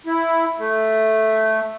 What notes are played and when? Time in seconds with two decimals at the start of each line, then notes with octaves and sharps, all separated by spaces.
0.06 E4
0.59 A3